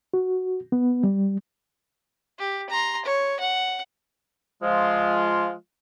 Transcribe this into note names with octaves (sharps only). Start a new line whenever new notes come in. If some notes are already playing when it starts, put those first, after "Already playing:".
F#4
B3
G3
G4
A#5 C6
C#5
F#5
F3 G#3 F4